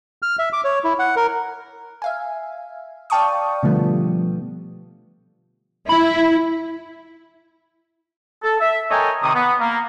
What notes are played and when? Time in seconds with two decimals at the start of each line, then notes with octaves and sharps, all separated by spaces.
0.22 F6
0.39 E5
0.53 D6
0.64 C#5
0.84 E4
0.99 F#5
1.16 A#4
2.02 E5 F5 G#5
3.10 D5 F5 G5 A5 C#6 D#6
3.63 B2 D3 F3 G3 A3 B3
5.89 E4 B5
8.43 A4
8.60 E5
8.91 A4 A#4 C#5 D#5 G5 G#5
9.22 C3 D#3 D#6
9.35 B3
9.60 A#3